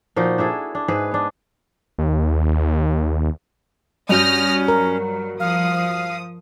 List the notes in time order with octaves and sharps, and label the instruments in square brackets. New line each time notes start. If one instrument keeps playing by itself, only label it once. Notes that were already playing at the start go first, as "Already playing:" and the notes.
[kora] A#2 F3 D#4 F#4
D4 E4 G#4 A4
D4
G#2 F#4 G#4 B4
B3 D4
[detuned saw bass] D#2
[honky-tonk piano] G2 F#4 G6 [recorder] C#4 [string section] D#6 F6 A#6
[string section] F#3 [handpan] A#4
[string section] F3 D#6 [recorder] F5